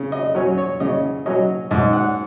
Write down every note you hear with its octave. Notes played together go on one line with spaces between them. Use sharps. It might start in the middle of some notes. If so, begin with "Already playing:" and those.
Already playing: C#3
D#5
F#3 C#4
C#5
C#3 D#5
F#3 C#4 D#5
G#2 D#5
F#5